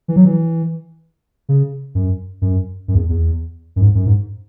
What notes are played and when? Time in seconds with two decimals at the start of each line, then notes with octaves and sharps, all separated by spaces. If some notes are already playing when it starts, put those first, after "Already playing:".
0.08 E3
0.16 F#3
0.25 E3
1.49 C#3
1.95 F#2
2.42 F#2
2.88 F#2
2.95 E2
3.09 E2
3.76 F#2
3.81 G#2
3.95 F#2
4.06 G#2